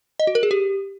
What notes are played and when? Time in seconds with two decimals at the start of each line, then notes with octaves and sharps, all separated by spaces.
0.20 D#5
0.27 F#4
0.35 A#4
0.43 G#4
0.51 G4